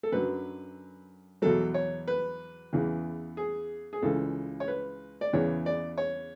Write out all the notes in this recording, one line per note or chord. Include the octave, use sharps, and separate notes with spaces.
A4
F#2 D3 F#3 B4
E2 B2 F#3 A4
C#5
B4
E2 C#3 E3
G#4
G#4
C#2 C#3 E3 A4
C#5
B4
D5
E2 C#3 E3 C#5
D5
C#5